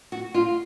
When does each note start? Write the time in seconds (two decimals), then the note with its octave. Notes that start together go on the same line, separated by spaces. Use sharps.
0.12 F#4
0.34 F4